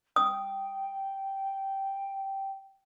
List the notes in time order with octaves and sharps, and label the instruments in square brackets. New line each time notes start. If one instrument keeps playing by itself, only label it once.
[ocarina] G5 [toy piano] D#6